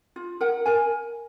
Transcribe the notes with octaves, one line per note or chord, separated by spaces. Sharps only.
F4
A#4 F#5
A#4 G#5